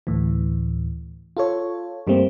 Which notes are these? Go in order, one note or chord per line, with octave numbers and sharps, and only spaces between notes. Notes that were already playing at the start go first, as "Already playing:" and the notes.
D2 A2 E3
F4 A4 C#5
G2 G3 A3 A#3 C4